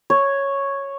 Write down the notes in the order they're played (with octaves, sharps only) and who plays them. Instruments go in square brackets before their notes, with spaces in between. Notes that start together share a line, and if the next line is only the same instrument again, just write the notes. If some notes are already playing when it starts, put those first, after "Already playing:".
[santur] C#5